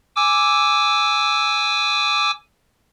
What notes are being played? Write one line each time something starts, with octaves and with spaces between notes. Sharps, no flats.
G#5 D6 E6